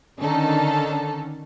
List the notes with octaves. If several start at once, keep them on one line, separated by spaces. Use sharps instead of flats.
D3 D#3 C#4 D#4 A4